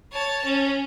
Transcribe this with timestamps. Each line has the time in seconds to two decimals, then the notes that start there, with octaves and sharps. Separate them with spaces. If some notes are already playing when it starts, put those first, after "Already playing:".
0.12 C#5 A5
0.45 C#4